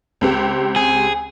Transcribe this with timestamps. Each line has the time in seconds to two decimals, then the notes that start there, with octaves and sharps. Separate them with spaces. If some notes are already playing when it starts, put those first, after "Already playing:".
0.21 C#2 C4 G4
0.76 G#4